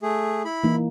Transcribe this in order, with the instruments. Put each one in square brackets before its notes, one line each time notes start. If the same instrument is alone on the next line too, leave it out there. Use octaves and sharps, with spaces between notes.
[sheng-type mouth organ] A3 G#4
E4 B5
[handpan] E3 A#3 D#4